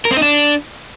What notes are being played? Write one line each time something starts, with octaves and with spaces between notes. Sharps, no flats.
A#4
C4
D#4
D4